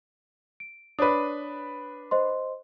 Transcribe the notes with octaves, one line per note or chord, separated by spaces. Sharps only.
D7
D4 B4 C#5 D#6
C5 D#5 C6